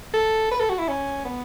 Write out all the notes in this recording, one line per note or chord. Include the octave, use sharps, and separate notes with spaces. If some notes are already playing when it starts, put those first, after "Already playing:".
A4
B4
A4
F#4
E4
C#4
B3